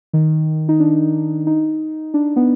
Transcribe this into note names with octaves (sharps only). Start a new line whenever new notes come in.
D#3
D#4
D4
D#4
D4
B3